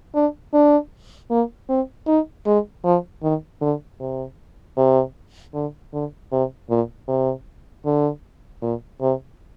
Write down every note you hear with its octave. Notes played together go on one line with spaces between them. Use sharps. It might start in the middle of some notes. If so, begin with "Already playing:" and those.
D4
D4
A#3
C4
D#4
G#3
F3
D#3
D3
C3
C3
D3
D3
C3
A#2
C3
D3
A#2
C3